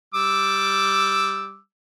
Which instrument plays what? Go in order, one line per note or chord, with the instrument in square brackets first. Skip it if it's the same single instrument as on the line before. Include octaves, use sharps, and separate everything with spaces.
[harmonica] G3 D6 E6